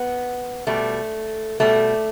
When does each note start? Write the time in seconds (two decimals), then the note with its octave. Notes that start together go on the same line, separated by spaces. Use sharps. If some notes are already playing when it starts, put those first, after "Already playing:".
Already playing: B3
0.67 B2 G3 A3
1.60 B2 G3 A3